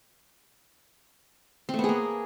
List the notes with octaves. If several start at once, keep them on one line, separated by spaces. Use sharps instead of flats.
C4
A3
B3
G#4
A#3